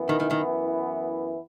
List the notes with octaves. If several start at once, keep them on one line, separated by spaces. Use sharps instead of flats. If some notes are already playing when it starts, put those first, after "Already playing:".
Already playing: F#2 E3 B3 E4
D#3
D#3
D#3